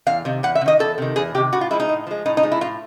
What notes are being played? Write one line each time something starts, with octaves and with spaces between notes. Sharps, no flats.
E2 F5
C3 D#3
E2 F#5
E5
C3
D#3 D#5
E2 A4
C3 D#3
E2 G#4
C3 D#3 G4
A2 F#4
F4
F3 G#3 E4
D#4
A2
F3 G#3
A2 D#4
D#4
F3 G#3
E4
A2 F4